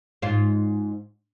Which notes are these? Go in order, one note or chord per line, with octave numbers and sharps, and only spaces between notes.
G#2 F4